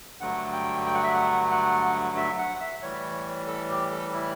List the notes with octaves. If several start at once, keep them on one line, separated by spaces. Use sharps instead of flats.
G2 D3 F#3 A3 F#5
G5
G5
F#5
E5
F#5
F#5
E5
F#5
E5
A2 E3 G3 C#5
A4
G4
A4
E4